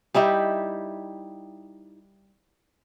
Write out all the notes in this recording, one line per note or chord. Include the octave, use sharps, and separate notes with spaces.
G3 D#4 E4 G4